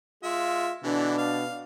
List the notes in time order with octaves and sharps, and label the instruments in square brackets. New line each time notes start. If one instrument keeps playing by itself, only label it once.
[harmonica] G#3 E5 [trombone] F4
[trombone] B2 [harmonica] D3 E3 [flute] D4
[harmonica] F5